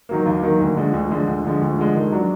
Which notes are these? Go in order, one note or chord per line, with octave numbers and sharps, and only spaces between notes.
D#3 F#3 A#3
D#2
D#3 F#3 A#3
D2
D3 F3 G#3
D2
D3 F3 G#3
D2
D3 F3 G#3
D2
D3 F3 G#3
D#3
F#3 D4 F#4